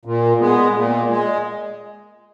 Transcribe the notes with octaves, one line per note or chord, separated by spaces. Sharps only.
A#2
G#3 B3
A#2
G#3